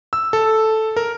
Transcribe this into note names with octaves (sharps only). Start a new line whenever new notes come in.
E6
A4
A#4